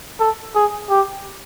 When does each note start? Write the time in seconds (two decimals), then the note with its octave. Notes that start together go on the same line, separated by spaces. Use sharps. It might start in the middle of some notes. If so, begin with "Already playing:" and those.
0.20 A4
0.55 G#4
0.90 G4